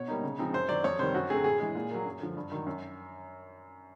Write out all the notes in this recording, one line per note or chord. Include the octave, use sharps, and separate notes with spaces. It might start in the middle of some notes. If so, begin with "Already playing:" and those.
Already playing: B2 C#5
G3 A#3 D#4
C#3
F3 G#3 C4 D#4
F#2 C5
D#3 F#3 D5
F2 C#5
C3 D#3 G3 C5
F#2 F#4
D3 F#3 A3 C4 G#4
A2 G#4
E3 G#3
A#2
F#3 A#3
F#2
D3 F3
G2
D#3 F#3
F#2